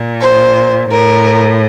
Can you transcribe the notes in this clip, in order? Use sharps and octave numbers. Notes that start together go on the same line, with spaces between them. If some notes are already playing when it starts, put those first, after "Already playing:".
Already playing: A#2
C5
A2 A#4